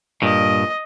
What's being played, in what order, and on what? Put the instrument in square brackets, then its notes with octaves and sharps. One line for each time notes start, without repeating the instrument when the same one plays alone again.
[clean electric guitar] G2 A#2 [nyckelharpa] D#5